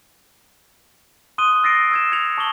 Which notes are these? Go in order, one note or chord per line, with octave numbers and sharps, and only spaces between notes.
C6 D#6 F#6 D#7 G7
E6 A6 A#6 C7 D7
E6 G#6 E7
G#6 C#7 F7
A5 C#6 D6 F#7 G7